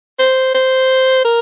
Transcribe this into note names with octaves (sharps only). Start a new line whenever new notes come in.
C5
C5
A#4